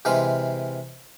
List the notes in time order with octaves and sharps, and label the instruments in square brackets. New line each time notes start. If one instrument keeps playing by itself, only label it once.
[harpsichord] C3 E3 G#3 F5 C6